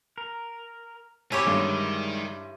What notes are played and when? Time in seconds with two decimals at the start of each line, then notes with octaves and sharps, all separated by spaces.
0.18 A#4
1.32 C4 E4 G4 C#5 G#5
1.47 G2 D3 D#3 G3 G#3